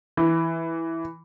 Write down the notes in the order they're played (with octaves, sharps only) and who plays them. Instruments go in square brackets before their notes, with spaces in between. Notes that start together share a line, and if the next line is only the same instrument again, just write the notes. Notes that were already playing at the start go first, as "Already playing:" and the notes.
[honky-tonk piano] E3